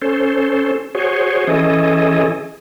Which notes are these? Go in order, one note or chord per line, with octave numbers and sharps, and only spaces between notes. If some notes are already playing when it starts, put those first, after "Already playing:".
C#4 A4 C5
F#4 G#4 C5 C#5
E3 C#4 G#4 A4 D#5